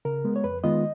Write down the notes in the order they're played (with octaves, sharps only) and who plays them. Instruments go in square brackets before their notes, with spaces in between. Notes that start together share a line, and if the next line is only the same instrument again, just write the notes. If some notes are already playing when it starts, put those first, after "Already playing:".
[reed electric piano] C#3 A#4
G#3 B3
C#5
F2 B4
D#3 G#3 B3 F4 D#5